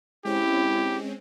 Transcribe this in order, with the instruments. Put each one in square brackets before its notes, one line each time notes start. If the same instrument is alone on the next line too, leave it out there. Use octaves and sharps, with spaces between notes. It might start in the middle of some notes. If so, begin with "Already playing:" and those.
[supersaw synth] G#3 C4 C#4 [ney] E4 [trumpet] G4